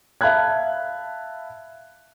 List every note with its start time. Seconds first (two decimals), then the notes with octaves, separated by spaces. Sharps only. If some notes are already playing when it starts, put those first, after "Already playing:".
0.21 E5 F5 A5 B5 F#6 G#6